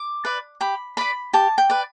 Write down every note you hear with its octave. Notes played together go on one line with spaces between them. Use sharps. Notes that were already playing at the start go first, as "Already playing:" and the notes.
Already playing: D6
B4 D5
G4 B5
B4 D5 B5
G4 A5
G5
B4 D5